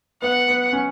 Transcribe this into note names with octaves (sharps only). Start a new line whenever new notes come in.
B3 F#5
B3
C#4